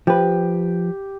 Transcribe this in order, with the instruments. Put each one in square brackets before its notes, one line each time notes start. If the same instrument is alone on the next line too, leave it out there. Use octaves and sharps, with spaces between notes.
[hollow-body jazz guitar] F3 B4 [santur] G4